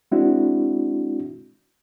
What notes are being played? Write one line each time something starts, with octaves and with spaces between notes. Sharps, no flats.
G#3 C4 D4 E4 F#4